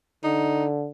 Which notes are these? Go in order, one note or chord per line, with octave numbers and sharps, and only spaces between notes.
D3 D#4